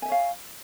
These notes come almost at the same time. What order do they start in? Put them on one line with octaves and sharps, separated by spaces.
G#5 E5 C#5 F5